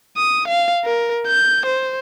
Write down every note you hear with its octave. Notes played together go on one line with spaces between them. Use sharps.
D#6
F5
A#4
G6
C5